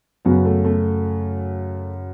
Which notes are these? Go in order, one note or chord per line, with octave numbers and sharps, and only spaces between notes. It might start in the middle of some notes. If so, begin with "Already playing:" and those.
F#2 C#3 F#3 B3
A3
A3